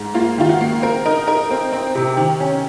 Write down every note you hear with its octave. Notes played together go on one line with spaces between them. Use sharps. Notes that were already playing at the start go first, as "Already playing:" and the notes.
Already playing: G#2
A#3 F4
D#3 F4
F#4
A#3
C4 A#4
D#4 A#4
D#4 A#4
C4
C4
C3
D#3
C#4